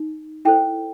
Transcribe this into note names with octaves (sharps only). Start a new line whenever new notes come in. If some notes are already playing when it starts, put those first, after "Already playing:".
Already playing: D#4
E4 A4 C5 G5